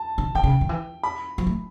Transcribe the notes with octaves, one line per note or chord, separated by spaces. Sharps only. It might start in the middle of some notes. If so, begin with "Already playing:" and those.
Already playing: A5
D3
D#3 G5
C#3
D#3
E3
B5
F3
A3